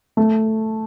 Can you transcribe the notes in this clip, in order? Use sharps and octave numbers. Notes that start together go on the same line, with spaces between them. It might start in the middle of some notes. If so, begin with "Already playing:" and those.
A3